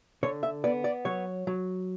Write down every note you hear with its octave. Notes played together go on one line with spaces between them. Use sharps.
D3 C#5
E5
B3 D5
D5
F#3 C#5
F#3